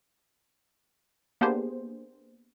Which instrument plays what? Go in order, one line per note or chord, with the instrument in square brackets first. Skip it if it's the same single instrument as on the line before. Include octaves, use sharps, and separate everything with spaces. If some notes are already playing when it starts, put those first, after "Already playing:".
[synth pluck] A#3 B3 D4 G4 G#4 C5